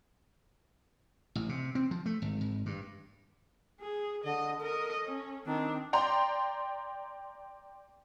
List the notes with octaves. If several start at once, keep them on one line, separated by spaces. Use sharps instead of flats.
A1
C3
C4
F3
A3
G#1
G#1
G2
G#4
D3 D#5
A4 A#4 D#5
C#4
D#3 C4 D4
D5 G5 A#5 C6